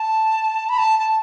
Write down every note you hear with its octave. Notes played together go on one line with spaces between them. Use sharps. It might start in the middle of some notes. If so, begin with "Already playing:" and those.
Already playing: A5
B5
A5
A5